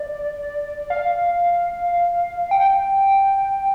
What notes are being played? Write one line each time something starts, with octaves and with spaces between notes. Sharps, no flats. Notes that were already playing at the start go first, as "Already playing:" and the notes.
Already playing: D5
F5
G5